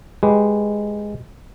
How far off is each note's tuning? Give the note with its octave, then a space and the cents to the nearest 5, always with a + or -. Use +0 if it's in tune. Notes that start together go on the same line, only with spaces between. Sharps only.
G#3 +0 G4 +0 B4 +0